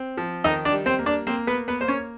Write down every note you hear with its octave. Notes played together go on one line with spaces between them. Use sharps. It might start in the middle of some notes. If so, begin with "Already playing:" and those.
Already playing: C4
F3
D#3 D#4 D#5
D4 D5
G3
C4 C5
A#3
D4 D5
A#3 C4 C5
B3 B4
A#3
B3 B4
A#3 C5
C#4 C#5